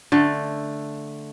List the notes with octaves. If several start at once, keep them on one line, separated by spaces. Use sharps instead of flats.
D3 A3